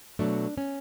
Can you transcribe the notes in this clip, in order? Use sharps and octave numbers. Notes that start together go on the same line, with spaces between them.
B2 F#3 A3 D4
C#4